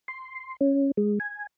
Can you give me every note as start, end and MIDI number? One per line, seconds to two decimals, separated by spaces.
0.08 0.56 84
0.61 0.91 61
0.97 1.19 56
1.20 1.47 80